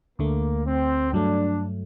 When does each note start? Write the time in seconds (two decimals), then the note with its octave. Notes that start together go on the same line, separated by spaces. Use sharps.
0.19 D2 D3 A3 A#3
0.66 C4
1.12 G2 F#3 A3 D4